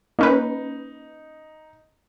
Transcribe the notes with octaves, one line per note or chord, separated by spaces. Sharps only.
A#3 C#4 D#4 B4